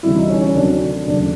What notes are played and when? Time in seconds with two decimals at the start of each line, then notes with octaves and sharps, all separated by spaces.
0.03 D2 C3 E3 G3 E4
0.16 D#4
0.30 C#4
0.41 C#4
0.55 D2 C3 D#3 F#3 D4
1.07 D#2 C#3 F#3 A3 D4